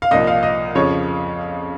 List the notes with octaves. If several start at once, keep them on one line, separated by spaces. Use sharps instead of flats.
F5
C2 A#2 F3 D#5
F5
D#5
F2 C#3 F3 C#5